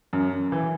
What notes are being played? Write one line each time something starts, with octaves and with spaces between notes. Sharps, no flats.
F#2
E3